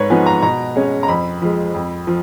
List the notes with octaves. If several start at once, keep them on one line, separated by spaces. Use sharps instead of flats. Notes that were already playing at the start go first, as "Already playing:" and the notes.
Already playing: G#2 B4 C#5
F3 B3 D#4 G#5
A#5
B2 A#5
G#3 C#4
A#5
F2 B5
F3 G#3
F2
F3